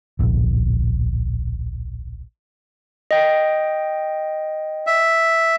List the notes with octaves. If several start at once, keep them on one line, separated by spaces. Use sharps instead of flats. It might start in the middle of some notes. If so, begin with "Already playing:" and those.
D1 A#1
D#5 G5
E5